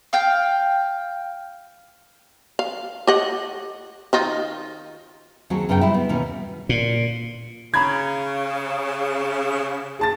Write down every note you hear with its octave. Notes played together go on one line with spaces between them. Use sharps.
F5 G5
F5
G4 D#5 F#5
D#3 D#4 F4
D#2 F#3 C4 F#4 G#4 A4
F#2 C#3 B3 A#4 B4 G5
G3 C4 E4
B3
D#2 B2 E3 C#4
A#2
C#3 A#5 B5 G#6
G#4 A5 A6